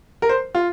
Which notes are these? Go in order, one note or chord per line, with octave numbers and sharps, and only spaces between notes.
A#4
C5
F4